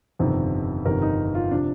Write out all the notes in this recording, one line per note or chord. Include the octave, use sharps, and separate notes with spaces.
G1 F2 C3 D#3
G1 F2 C3 D#3 A#4
D#4
F4
C3 F3 D4